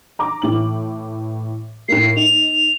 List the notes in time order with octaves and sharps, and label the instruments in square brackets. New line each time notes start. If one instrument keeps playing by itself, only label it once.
[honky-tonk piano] A#5 D6
A2 E3 F#7
[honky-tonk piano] A2 A#3 [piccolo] C7
[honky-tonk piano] D#4 [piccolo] F7